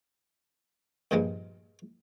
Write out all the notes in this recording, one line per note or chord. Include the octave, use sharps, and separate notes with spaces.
G2 A#2 F3 G3 G#3